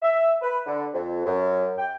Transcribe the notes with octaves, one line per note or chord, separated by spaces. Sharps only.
E5
B4
D3
F2
F#2
G5